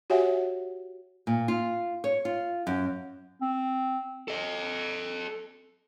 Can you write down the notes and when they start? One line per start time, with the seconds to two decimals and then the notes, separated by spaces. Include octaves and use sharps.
0.10 F#4 G4 C#5 E5 F#5 G#5
1.27 A#2
1.48 F4
2.04 C#5
2.25 F4
2.67 F#2
3.41 C4
4.28 A4 D#5